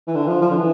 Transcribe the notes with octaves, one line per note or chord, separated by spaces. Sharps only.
E3
D3
F3
F3
D3
E3